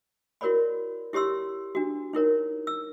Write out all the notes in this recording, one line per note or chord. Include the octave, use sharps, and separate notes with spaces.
E4 F#4 A#4 C#5 D5 B5
E4 G4 C#5 C6 E6
D4 F#4
D#4 E4 A#4 C#5
E6